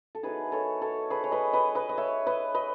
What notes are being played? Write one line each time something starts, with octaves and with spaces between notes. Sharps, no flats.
A4
D#3 F#3 B3 E4 G#4 B4
A4 C#5
A4 C#5
G#4 B4
C#5
B4 D#5
B4 D#5
B4 D#5
D#5
C#5 E5
B4 D#5
B4 D#5